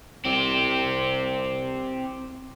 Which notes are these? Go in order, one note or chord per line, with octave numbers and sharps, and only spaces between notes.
C2 C4 G4